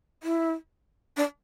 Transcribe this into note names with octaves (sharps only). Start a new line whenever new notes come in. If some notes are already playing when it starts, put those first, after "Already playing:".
E4
D4